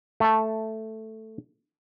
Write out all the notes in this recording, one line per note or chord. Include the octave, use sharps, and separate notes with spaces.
A3 A5